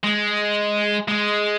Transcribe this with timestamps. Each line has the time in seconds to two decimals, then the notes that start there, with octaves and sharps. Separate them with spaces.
0.03 G#3
1.08 G#3